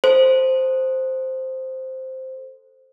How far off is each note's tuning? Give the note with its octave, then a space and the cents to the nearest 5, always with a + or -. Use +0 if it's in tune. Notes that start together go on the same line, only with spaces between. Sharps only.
A4 +0 C5 +0